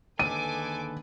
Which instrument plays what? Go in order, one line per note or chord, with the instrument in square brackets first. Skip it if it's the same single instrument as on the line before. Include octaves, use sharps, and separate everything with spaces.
[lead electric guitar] D#2 D3 [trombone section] G#3 A4 B4 [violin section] G#5 D6 [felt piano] D#7